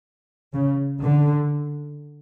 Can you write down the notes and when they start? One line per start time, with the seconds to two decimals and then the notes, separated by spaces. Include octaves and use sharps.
0.53 C#3
1.01 D3